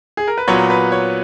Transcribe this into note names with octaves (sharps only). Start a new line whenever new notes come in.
G#4
A#4
B4
A#2 F#3 B3 C#5
B4
C#5